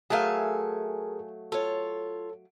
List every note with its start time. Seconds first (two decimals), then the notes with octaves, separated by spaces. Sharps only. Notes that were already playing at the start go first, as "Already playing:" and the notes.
0.10 F#3 A3 G#4 A#4 F5 G#5 A5
1.52 F4 A4 C#5